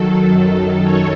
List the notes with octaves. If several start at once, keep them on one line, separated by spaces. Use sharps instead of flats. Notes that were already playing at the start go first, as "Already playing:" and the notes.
Already playing: D#3 F#3 A4
F#2 D#3 F#3
C#5